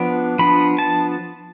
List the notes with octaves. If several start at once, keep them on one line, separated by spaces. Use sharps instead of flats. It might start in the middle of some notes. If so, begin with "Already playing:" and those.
Already playing: F3 B3 D4
F3 B3 D4 B5
A5